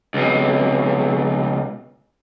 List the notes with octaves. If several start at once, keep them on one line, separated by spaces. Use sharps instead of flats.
C#2 B2